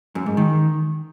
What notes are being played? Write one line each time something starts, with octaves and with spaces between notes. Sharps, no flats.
F#2
G#2
D#3